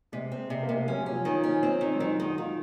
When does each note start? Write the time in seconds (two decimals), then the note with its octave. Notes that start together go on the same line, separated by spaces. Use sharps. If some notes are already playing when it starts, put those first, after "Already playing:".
0.12 C3 G#3
0.32 C4
0.50 C3
0.63 A#3
0.69 C3
0.75 G#3
0.87 F#3 C#4
1.01 F#3
1.06 C#4
1.12 F3
1.25 D#3
1.43 C#4
1.63 C4
1.81 D#3
1.93 G#3
2.00 D#3 F#3
2.13 D#4
2.20 D#3
2.25 F#4
2.38 D#3 F4